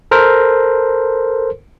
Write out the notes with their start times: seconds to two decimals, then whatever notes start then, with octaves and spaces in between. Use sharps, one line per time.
0.11 A4 A#4 C5